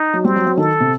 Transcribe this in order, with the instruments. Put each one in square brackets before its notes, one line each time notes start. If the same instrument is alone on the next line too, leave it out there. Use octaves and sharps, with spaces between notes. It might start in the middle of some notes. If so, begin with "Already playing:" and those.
Already playing: [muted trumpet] D#4
[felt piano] F#3
[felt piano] G3 [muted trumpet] C4
[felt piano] F#3
F#3
[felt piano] D#3 [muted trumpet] A4
[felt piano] C3